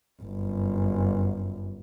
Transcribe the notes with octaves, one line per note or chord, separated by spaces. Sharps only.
G1 F#2